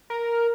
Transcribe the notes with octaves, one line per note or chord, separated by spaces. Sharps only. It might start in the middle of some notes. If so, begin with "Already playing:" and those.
A#4